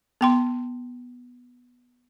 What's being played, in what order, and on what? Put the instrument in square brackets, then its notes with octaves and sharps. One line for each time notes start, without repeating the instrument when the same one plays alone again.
[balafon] B3 G5 C6